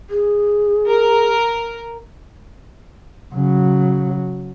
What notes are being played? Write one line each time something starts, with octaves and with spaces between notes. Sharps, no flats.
G#4
A#4
C#3 F#3